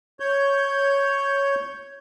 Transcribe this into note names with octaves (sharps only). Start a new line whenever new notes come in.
C#5 G6